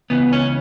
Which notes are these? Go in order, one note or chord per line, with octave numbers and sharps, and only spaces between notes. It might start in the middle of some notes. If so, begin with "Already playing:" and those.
C#2 C#3 E3 B3
C#4